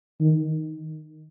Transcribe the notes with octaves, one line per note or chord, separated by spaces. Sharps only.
D#3